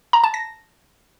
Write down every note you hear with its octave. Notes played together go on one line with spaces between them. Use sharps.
A#5
A5
A#6